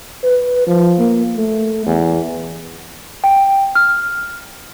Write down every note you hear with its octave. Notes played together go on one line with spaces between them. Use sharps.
B4
F3
A#3
A3
E2
G5
F6